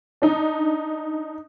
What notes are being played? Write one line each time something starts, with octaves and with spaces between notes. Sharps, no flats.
D4 D#4